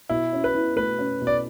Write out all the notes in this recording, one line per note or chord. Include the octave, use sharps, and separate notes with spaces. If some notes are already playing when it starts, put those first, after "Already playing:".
B2 E4
C#4
B4
E4
A3 B4
C#4
B2
D5